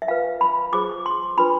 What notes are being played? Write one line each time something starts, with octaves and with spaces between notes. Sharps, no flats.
E5
F4 B4 F5
B5
F4 G#4 C5 D6
C6
D4 F4 B4 B5